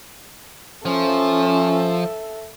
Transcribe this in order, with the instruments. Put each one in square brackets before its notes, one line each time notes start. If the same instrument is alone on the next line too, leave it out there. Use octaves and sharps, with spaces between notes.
[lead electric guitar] F3 [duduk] C#4 [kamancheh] A4 E5